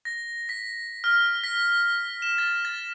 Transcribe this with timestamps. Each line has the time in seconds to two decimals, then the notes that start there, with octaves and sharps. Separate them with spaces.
0.05 A#6
0.49 B6
1.04 F6
1.44 B6
2.22 E7
2.38 A6
2.65 A6